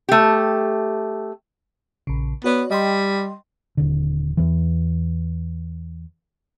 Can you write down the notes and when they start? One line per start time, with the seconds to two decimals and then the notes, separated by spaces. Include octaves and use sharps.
0.09 A3 G4
2.07 A#1 C#3
2.44 B3 F#4 C#5 D5
2.71 G3 D#5 G5 C6
3.77 D#1 D3
4.37 E2 E3